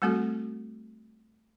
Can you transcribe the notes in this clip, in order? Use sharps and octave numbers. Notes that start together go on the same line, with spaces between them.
G3 A3 C4 F#4 A4